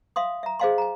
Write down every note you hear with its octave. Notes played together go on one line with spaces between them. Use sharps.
E5 F5 C6 D#6
E5 A#5
G#4 C5 D#5 F5 G#5 C6
G#5 A#5